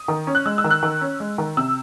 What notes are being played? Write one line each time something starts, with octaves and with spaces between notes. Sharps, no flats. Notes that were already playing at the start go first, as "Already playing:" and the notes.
Already playing: D#6
D#3
C#4
F#6
G#3 E6
E6
D#3
F#6
D#3
C#4
G#3
D#3
C3 E6